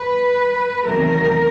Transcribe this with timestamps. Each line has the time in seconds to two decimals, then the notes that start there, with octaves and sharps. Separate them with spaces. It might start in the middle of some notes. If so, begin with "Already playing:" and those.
Already playing: B4
0.85 E2 C3 D#3 F#3 A3 A#4